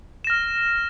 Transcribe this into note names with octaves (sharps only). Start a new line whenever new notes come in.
F6 A#6 E7